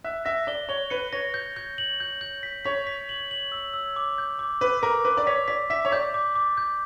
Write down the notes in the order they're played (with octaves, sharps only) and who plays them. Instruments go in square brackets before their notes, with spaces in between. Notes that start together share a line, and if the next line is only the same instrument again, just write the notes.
[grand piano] E5 [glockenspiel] F#6
[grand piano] E5 [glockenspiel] A#6
[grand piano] D5 [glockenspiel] G7
[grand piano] C#5 [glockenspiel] G7
[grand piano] B4 [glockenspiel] C#7
[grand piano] C#5 [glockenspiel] A#6
[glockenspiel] G6
G6
F#7
G6
G6
B6
[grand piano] C#5 [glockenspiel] B6
[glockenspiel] B6
F#7
F#7
E6
E6
D6
G6
D6
[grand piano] B4 [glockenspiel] D6
[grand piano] A#4 [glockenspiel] D6
[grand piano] B4 [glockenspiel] D6
[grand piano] D5
[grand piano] C#5 [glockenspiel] B6
[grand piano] D5 [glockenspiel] B6
[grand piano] E5 [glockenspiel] B6
[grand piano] C#5
[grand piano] D5 [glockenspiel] G6
[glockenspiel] D6
D6
G6